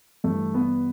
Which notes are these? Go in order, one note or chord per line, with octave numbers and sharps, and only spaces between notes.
G2 E3 A3
B3